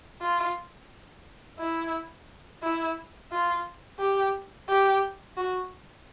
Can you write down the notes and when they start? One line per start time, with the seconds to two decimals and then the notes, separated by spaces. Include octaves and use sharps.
0.21 F4
1.59 E4
2.63 E4
3.31 F4
3.99 G4
4.69 G4
5.37 F#4